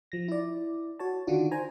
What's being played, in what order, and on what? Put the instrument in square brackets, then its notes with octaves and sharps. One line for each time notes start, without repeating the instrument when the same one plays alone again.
[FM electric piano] F3 A#6
E4 D5
F#4 C#5 A5
D3 D#3 D4 F4 F#4
C5 G#5 A#5